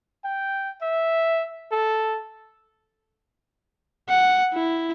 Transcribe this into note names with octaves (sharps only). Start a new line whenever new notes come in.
G5
E5
A4
F#5
E4